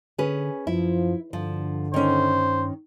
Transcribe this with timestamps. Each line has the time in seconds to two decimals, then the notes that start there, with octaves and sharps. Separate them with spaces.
0.18 D3 C#4 G#4 B4
0.67 F#2 F3 E4
1.33 G2 D3 F3
1.94 D#3 C#4 C5